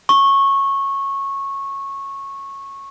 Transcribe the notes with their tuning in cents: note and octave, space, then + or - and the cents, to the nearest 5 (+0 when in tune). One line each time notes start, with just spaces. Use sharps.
C#6 -15